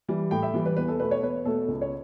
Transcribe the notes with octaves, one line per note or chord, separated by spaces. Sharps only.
E3 G3
A2 G5
E5
E3 G3
B4
E2 B4
A4
B2 A3 B4
C#5
E2 B4
B2 A3 A4
C#2
C#5